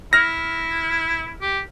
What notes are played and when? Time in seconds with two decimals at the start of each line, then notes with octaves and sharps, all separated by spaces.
0.13 E4 F6 A#6
1.41 G4